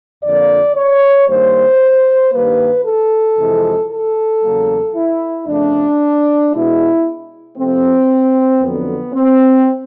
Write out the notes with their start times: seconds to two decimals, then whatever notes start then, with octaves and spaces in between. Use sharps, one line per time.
0.23 F2 D3 F3 A#3 D5
0.76 C#5
1.28 G2 D#3 G3 A#3 C5
2.33 G2 D#3 G3 A#3 B4
2.85 A4
3.38 F2 C3 E3 G#3
3.91 A4
4.42 E2 C#3 F#3 A#3
4.95 E4
5.47 F2 C#3 F3 A3 D4
6.52 B2 G#3 E4
7.57 C3 F3 A3 C4
8.61 F2 D3 F#3 B3
9.14 C4